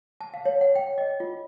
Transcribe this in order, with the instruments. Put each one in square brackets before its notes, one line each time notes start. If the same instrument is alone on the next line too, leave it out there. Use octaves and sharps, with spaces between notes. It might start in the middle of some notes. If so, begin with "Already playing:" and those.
[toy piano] A5
F5
C#5
F#5
G5
D#5
F4